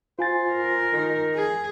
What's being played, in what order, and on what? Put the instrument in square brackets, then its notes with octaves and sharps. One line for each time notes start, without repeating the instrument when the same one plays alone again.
[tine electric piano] F4 G#5 A6 [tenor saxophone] C5
[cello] A#4
[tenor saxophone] D#3
[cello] G#4